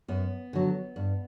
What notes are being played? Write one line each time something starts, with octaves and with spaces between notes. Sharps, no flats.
F#2 B3
D3 F#3
G2